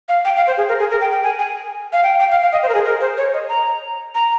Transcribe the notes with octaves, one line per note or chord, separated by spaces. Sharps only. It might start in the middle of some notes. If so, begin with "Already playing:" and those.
F5
G5
F5
C5
G#4
A#4
G#4
A#4
G5
G5
G#5
G#5
F5
G5
G5
F5
F5
D#5
C5
A#4
G#4
A#4
C5
C#5
D#5
A#5
A#5